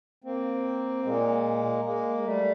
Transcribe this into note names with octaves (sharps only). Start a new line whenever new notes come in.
A#3 C4
A#2 G#3 A#3
G#3 A#3
G#3
G3 A3